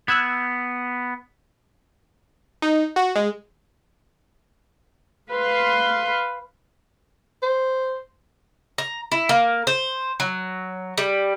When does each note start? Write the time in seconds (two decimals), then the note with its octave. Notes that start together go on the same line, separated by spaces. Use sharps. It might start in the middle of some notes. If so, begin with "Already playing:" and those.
0.08 B3 E6 F#6 G#6
2.62 D#4
2.96 F#4
3.16 G#3
5.31 B4 F5 C6
7.43 C5
8.78 A#5
9.12 E4
9.29 A#3
9.67 C5
10.20 F#3
10.98 G3